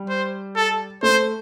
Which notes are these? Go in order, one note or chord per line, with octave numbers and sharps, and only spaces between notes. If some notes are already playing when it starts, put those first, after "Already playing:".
Already playing: G3
C5
A4
A3 C5